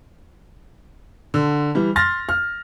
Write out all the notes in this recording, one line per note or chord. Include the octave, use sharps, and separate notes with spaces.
D3
E3 G3
C6 F6 A6 A#6
F6